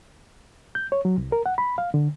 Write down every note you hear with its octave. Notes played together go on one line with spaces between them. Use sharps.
G6
C#5
F#3
C2
A#4
F#5
B5
F5
D3